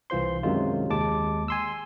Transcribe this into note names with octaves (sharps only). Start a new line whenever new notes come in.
C2 E3 F4 C5 C6
F#2 C3 D#3 F#3 G#3 F4
D#2 G#3 A5 D6
G#5 C6 E6